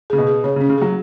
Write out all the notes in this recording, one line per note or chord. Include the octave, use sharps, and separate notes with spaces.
C#3 G#4
B2
G#4
C#3 C#5
C#3 C#4
C#3
F#3 G#4